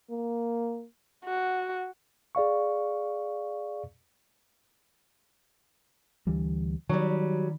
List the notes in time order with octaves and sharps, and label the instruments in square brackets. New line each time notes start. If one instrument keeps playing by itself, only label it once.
[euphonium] A#3
[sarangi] F#4
[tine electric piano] G#4 D5 F5 C#6
[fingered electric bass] D2 E3 G3
[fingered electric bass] D#3 [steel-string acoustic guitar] F#3 G3